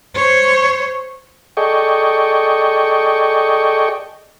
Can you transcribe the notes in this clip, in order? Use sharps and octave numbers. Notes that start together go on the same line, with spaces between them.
C5 C#5
G#4 A4 D5 D#5 G5 C#6